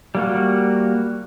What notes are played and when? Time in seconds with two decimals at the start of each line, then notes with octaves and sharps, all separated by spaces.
0.15 G3 A#3 F#4